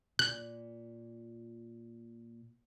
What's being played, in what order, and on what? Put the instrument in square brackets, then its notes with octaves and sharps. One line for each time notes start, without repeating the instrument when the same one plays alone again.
[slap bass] A#2 [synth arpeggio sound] F#6